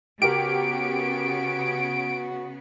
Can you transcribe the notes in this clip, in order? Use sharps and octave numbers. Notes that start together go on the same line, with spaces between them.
C#3 B3 F#4 G4 A#4 D7